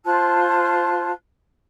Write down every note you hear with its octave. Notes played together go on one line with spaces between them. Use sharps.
F4 C5 A5 F#6